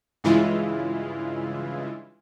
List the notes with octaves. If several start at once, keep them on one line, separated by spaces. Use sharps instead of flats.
G2 C#3 E3 G#3 E4 F4